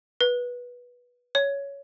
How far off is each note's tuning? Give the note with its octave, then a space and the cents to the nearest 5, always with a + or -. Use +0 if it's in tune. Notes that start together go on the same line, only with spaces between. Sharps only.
B4 -15
C#5 +10